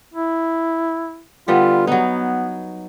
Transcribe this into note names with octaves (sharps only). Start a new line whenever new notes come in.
E4
D3 G3 B3 F4
F#3 B3 D#4